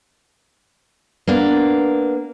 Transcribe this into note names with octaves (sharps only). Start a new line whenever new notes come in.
A#3 B3 D4